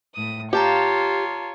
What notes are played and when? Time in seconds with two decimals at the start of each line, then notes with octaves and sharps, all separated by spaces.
0.16 A2 D#6
0.53 F4 G4 C#5 F5 A5 A#5